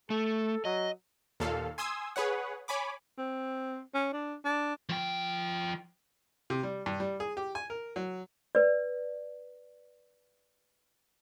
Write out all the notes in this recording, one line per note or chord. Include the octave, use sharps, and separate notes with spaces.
A3 A4
F#3 D#5
D#2 A#2 A4 F5
G#5 C6 D#6 E6 G#6
G#4 B4 C#5 F#5
C#5 G#5 B5 D6
C4
C#4
D4
D4
F3 G5
C3
G3
G2
G3
G#4
G4
G#5
A#4
F#3
B4 D5